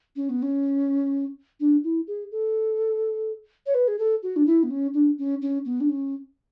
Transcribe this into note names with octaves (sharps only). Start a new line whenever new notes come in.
C#4
B3
C#4
D4
E4
G#4
A4
C#5
B4
G#4
A4
F#4
D4
E4
B3
C#4
D4
C#4
C#4
B3
D4
C#4